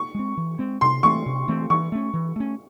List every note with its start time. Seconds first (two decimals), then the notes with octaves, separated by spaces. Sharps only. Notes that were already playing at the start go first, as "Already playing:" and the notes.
Already playing: C#6
0.14 G#3 C4
0.37 E3
0.59 G#3 C4
0.81 C3 C6
1.03 E3 A3 C4 C#6
1.26 C3
1.48 E3 A3 C4
1.70 E3 C#6
1.92 A3 C#4
2.14 E3
2.36 A3 C#4